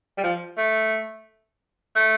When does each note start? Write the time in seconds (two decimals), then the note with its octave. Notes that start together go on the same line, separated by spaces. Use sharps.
0.18 G3
0.24 F3
0.58 A3
1.96 A3